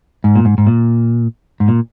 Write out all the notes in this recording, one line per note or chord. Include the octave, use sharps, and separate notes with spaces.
G#2
A#2
G#2
G#2
A#2
G#2
A#2